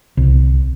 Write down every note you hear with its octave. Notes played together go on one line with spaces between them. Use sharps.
C2